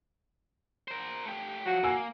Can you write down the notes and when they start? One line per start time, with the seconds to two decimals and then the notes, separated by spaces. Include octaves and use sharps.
0.88 A#4 C5
1.25 A3 G4
1.66 F3 F#3 F#4
1.83 A#3 G#5 E6